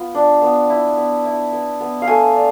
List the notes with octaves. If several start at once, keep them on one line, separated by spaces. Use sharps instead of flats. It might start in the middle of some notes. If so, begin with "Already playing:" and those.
Already playing: B3 F4
D4
B3
E4
B3
E4
B3
B3
F5
A3 G#5
D4